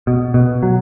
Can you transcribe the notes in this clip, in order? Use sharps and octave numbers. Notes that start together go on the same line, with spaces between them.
B2
B2
F#3